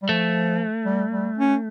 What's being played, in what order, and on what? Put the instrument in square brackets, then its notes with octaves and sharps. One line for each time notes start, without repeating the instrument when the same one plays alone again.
[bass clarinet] G3
[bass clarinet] F3 [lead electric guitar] A3
[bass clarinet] G3
G3
C#4